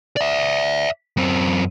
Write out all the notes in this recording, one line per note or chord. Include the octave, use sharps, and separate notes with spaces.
D5 E5
F#2 C4